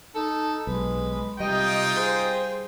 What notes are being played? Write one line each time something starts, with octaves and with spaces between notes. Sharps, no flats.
D#4 A4
B1 G#3 B4
C3 G3 D#4 F4 D#5 G5
G#4 C5